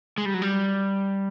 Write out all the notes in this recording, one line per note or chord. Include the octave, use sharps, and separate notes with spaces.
G#3
G3
F#3
G3